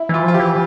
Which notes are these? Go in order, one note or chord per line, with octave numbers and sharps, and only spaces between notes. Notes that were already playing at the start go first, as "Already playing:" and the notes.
Already playing: E4
E3 F4
F3 F4
G4
E3